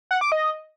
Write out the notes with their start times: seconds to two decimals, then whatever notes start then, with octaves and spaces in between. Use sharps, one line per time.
0.11 F#5
0.21 D6
0.32 D#5